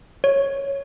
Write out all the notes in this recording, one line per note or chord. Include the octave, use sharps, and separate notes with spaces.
C#5